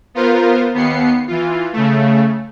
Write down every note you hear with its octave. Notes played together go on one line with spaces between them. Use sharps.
B3 F4 A#4 C5
D#2 B3 C7 C#7
E3 F4
C#3 A3